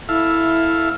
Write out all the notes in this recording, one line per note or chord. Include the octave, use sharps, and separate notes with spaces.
E4 A4 E5 F5